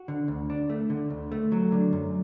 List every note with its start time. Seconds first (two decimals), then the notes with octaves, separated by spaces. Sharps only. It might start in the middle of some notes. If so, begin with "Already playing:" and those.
Already playing: F#4
0.08 D3
0.28 D2
0.50 D4
0.70 A3
0.90 D3
1.10 D2
1.32 A3
1.52 F#3
1.72 D3
1.93 F#2